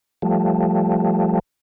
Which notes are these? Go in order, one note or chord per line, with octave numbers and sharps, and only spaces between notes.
F3 G3 A3